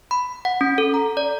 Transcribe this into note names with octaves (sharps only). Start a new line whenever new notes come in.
B5
F#5
C#4
A4
A#5
D5